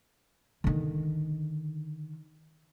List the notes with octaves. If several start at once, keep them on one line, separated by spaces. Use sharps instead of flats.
D3 D#3